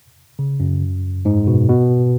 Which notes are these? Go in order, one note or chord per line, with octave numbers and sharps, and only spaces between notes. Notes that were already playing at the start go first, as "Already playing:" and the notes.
C#3
F#2
G#2
B2
B2